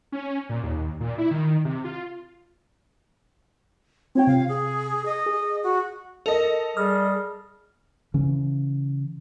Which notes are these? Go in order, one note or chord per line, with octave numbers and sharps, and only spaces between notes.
C#4
A#2
D#2
A#2
E4
D#3
C3
F4
C4 F4 C#5 G5
C3 F5
G#4
D#5
G#4
F#4
A4 A#4 D#5
G3 G#4 D#6 F6
C#3 E3 C#4